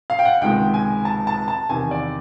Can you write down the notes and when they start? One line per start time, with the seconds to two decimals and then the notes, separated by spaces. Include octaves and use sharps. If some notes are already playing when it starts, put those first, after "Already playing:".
0.10 F5
0.19 G5
0.25 F#5
0.41 C#2 C3 D#3 G#3 G5
0.74 G#5
1.05 A5
1.27 A5
1.48 A5
1.69 E2 C3 D#3 G#5
1.91 D5